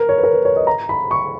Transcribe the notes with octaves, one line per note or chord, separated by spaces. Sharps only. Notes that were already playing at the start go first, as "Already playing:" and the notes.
Already playing: A#4
C#5
B4
A#4
B4
C#5
D#5
A#5
B5
C#6